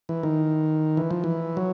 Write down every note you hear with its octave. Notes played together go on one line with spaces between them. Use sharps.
E3
D#3
E3
F3
E3
F#3